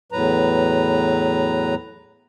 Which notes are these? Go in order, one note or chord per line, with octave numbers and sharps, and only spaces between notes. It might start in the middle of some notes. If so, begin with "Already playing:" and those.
E2 A2 F#3 B4 A#5